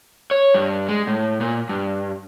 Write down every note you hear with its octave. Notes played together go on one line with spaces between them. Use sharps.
C#5
G2
G#3
A2
A#2
G2